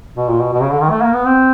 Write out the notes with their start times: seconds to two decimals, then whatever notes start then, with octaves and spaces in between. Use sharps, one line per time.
0.16 B2
0.29 A#2
0.41 B2
0.53 B2
0.62 C#3
0.71 D3
0.81 D#3
0.90 A3
1.02 A#3
1.14 B3
1.27 C4